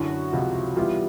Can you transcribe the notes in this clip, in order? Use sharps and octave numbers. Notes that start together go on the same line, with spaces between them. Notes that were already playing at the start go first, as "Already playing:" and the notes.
Already playing: F#2 D3 F#3 E4 F#4
C#2 C3 F3
E3 G3 B3 E4 F4 G4